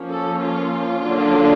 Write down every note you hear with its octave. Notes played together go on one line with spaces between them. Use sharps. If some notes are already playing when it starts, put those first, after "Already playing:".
Already playing: F3 A#3 C#4
A4
F4
D3 F#3 A#3 D4